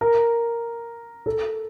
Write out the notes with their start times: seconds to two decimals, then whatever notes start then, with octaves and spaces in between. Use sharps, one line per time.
0.01 A#4
1.26 A4